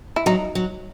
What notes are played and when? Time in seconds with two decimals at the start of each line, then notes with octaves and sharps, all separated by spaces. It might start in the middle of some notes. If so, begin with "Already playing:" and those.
0.16 E4
0.26 F#3 D#4
0.55 F#3